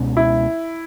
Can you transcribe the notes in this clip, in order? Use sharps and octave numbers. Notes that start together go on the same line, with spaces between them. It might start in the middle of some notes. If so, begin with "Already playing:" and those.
Already playing: C#2 B2 G#3 C#4
E4